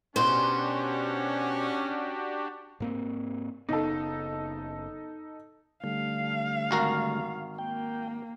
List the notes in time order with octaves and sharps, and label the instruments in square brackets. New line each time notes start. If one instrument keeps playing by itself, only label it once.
[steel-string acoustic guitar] B2 C5 [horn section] C#4 [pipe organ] D4 F#4 G4
[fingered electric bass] G#2 A#3 C4
[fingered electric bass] F#1 C#3 B3 [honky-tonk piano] D#4 A4
[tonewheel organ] D3 G3 A3 [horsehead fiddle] F5
[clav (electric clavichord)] G#1 F#4 A#4
[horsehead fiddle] A#3 [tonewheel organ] G5